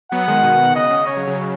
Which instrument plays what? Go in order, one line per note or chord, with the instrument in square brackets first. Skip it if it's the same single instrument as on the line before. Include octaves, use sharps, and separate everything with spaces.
[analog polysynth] F#3 B3 [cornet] F#5
[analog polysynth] D#3 G#3
B2 D#3
[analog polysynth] C#3 [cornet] D#5
[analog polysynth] C#3
[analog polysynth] C#3 [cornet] C#5
[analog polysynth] C#3 F#3
C#3 F#3